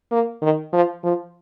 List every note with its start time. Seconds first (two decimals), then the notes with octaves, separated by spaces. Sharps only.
0.12 A#3
0.42 D#3
0.73 F3
1.04 F3